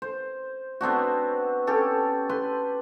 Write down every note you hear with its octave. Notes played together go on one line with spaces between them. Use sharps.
C5
B3 C4 D4 F#4
C#4 G4 A4
B4 C6